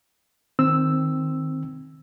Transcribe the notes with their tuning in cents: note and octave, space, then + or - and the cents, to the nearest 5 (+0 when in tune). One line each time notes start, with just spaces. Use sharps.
D#3 +0 C4 +0 E6 +0